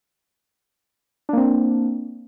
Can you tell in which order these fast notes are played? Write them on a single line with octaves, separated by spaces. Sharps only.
D4 A#3 C4